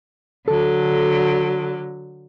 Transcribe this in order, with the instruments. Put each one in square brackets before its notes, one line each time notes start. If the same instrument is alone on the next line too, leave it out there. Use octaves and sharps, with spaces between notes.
[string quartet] D3 F#3 [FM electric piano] A4